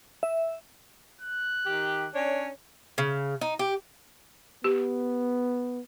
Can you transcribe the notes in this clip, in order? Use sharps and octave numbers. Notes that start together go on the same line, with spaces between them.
E5
F#6
D#3 G4
C#4 D4 C#5
C#3
D#4
G4
B3 G4